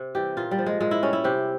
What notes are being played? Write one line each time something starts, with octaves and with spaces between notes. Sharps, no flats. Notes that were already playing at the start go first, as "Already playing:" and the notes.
Already playing: C3
E3 G3 G4
A#2 F4
G3
F3
G#3
A#2 G#3
E4
G3 C#4
E4
C3 G4